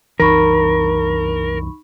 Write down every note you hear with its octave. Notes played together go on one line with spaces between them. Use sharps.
C2 F#2 E3 D#4 A#4 B5 C#6